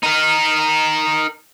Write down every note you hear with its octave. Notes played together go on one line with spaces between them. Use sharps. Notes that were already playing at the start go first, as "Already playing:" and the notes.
D#4 A#4